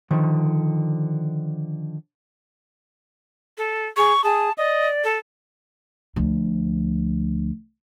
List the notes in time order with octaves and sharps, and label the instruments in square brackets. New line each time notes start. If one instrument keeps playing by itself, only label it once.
[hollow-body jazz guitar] D3 D#3 F3
[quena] A4
[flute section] G#4 [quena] C#6
[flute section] G#4 D#6 [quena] A5
[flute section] D5 [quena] D#5
[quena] A4
[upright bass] D2 F3